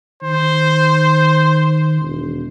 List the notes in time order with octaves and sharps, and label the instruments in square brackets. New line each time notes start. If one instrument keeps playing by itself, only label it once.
[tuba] D#3 [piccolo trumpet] C5
[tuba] E1